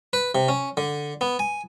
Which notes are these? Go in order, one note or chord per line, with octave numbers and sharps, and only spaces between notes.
B4
C3
C#4
D3
B3
G#5